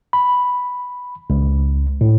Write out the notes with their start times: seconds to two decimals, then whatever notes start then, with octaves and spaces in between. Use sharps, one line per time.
0.13 B5
1.30 C#2
2.01 A2